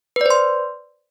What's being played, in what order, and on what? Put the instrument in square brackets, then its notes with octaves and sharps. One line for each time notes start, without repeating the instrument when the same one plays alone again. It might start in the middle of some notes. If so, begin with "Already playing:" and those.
[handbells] B4
D5
C5
C6